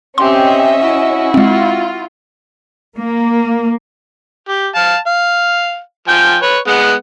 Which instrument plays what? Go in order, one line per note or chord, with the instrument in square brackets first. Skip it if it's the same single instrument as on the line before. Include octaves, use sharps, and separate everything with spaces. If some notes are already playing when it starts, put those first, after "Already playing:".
[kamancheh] C4 G4 [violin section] C#4 D#5 E5 [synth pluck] C6
[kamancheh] E4 F#4
[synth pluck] G#3 C4 [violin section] F4
[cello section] A#3
[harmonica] G4
F5 A5
F5
F3 G5 G#5
B4 C#5
G#3 B3 F#5